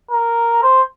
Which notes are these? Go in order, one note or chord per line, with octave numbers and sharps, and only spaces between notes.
A#4
C5